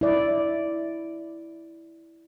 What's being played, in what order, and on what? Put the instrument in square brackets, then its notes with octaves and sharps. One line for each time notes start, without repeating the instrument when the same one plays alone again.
[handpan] E4 D5